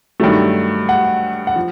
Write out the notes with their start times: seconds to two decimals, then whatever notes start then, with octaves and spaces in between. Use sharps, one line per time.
0.20 G2 D#3 F#3 A3
0.89 F#5
1.47 F#5
1.56 F3